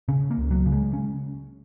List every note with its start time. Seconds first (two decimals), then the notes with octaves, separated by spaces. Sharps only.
0.08 C#3 C#4
0.31 A#3
0.38 C#2
0.51 F#3
0.66 C#3
0.72 G#3
0.93 C#4